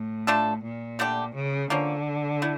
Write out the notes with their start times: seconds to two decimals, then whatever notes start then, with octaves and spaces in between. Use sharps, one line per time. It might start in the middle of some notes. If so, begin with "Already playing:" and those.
Already playing: A2
0.27 A3 D4 F4 A4
0.63 A#2
0.99 D3 A3 D4 G4
1.34 C#3
1.70 D3 F3 A#3 C#4
2.42 A3 E4